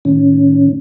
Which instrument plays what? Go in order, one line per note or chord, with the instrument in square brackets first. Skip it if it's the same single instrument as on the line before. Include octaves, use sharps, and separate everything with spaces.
[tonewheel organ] A2 D#3 C#4